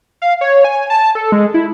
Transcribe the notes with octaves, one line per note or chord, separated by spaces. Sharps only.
F5
C#5
G#5
A5
A4
G#3
E4